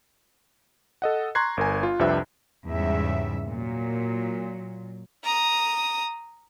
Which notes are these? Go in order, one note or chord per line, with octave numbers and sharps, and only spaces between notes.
A4 D#5 F#5
A#5 C6 C#6 F#6 G#6 C7
G1 A#4 G#5
F4
C2 F2 C3 D4 B4 E5
E2 G#2 C#3 G3 E5
A#2 F#3
A#5 D#6